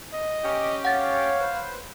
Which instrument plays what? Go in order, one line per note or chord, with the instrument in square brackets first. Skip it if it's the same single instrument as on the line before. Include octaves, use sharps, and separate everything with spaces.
[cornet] D#5
[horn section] C#4 G4
[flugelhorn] C#5 [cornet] F5 [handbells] F#5 A6
[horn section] B4 C5